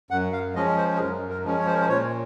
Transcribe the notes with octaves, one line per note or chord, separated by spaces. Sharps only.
F#2 F#5
F5
F3 G#3 C#4 D#5
C5
G#4
F#2 A#4
A#4
F3 G#3 C#4
C#5
C5
A#4
C5
A#2 C#5